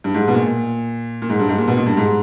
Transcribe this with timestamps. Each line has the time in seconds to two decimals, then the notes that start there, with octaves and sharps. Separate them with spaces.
0.04 G2
0.14 G#2
0.28 B2
0.34 A#2
1.22 A#2
1.29 G#2
1.39 G2
1.49 G#2
1.58 A#2
1.68 B2
1.77 A#2
1.86 G2
1.97 G#2